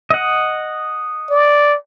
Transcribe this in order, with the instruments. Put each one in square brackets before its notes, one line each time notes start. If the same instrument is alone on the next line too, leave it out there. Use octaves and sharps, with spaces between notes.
[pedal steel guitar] D#5 F#5
[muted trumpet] D5